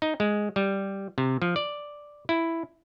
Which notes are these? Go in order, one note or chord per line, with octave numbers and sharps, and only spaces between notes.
D#4
G#3
G3
C3
F3
D5
E4